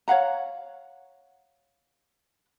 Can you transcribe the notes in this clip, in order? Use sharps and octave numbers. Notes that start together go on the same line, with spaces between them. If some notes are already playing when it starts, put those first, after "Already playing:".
C#5 F5 F#5 A#5